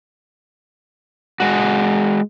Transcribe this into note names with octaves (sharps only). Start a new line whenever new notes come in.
G#3 F#4